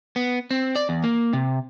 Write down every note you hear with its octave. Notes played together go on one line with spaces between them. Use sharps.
B3
C4
D5
E2
A#3
C3